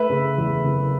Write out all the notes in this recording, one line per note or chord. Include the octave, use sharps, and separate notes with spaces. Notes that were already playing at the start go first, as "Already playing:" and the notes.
Already playing: A3 B4 E5
C#3
E2
F#1